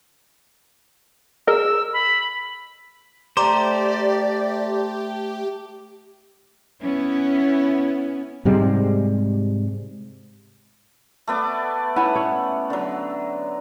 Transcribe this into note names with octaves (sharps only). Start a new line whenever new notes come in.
G#4 A#4 D#5 E6
B5
A3 G4 C5 D5 A#5 C6 D6
B3 C#4 E4
G#2 C3 G3 G#3
A3 B3 D5
B3 C#4 E4 F#5
C#5
D3 F#3